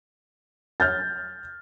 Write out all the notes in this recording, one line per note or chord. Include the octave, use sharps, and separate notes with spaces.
F6 G6 A6